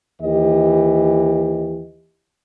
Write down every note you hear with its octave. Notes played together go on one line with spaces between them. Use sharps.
D#2 E3 G4 D#5